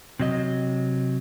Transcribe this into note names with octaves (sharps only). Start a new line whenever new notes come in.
C3 F#3 D#5